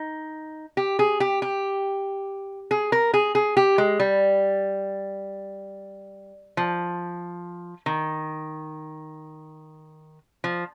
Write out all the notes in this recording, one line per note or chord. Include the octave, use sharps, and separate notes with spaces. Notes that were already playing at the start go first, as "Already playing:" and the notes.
Already playing: D#4
G4
G#4
G4
G4
G#4
A#4
G#4
G#4
G4
G#3
G3
F3
D#3
F3